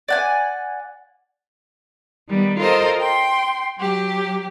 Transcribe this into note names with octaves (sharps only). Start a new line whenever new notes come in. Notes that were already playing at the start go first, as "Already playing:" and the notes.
D5 F#5 G#5
D#3 G3 B3
F4 A4 A#4 C5 D#5
G5 C6
F#3 G4